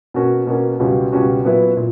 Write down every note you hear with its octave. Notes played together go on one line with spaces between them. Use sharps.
B2 A#3 C#4 F#4
B2 A#3 C#4 F#4
C#2 B2 G3 C#4 F#4
C#2 B2 G3 C#4 F#4
A#2 F#3 B3 E4 B4
A#2